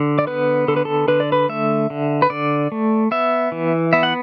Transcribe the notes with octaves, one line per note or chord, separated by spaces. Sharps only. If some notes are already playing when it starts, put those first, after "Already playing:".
Already playing: D3
D5
B3 B4
D3 A4
B4
A4
D3 B4
D5
B4
A3 E5
D3
B4
D3 D5
A3
B3 E5
E3
B3 E5
F#5